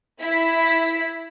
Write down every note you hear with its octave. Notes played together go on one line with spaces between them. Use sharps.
E4 B6